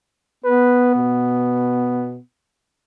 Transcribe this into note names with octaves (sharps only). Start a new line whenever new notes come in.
B3 B4
B2